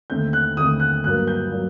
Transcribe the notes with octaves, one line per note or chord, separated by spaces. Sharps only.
D#2 D3 A3 C4 G6
F#6
D#2 D3 A3 C4 D#6
F#6
G2 F#3 A#3 F#6
G6
F#3 A#3